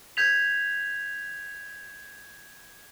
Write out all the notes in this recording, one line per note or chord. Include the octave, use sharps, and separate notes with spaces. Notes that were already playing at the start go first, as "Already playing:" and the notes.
G6 G#6 B6 F7